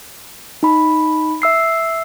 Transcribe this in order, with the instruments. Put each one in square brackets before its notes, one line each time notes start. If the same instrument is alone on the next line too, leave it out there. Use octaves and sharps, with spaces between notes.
[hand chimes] D#4 B5
E5 E6 C7